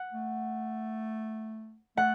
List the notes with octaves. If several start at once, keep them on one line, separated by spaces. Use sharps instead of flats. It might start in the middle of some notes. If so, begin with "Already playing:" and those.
Already playing: F#5
A3
A3 F#5